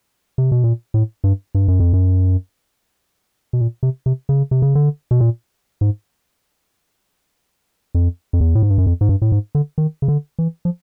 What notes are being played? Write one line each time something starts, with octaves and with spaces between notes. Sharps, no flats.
C3
B2
A#2
A2
G2
G2
F#2
F2
F#2
B2
A#2
C3
C3
C#3
C3
C#3
D3
B2
A#2
G#2
F2
F2
E2
A2
G#2
G2
F#2
F2
G#2
G2
A2
G#2
D3
D#3
C#3
D3
E3
F3